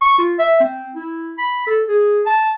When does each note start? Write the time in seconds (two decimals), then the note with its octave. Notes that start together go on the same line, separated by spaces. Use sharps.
0.02 C#6
0.18 F4
0.39 E5
0.60 C4
0.95 E4
1.38 B5
1.66 A4
1.88 G#4
2.26 A5